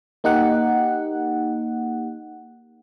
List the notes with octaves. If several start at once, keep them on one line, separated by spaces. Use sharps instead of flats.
A#3 D#4 G4 F#5